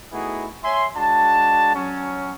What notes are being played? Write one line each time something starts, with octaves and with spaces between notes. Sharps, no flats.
A3 B3 D#4 E4 F#4 G#4
C#5 E5 G#5 C6
G#3 D4 F#4 A5
F#3 C#4